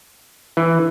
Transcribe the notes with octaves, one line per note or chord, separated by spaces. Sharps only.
E3